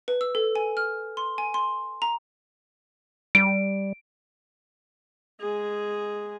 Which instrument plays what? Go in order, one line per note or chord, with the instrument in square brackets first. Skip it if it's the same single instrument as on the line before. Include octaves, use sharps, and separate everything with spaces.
[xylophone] B4
E6
A4
G#5
F6
C6
G#5
C6
A#5
[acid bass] G3 [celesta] D7
[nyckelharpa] G#3 G#4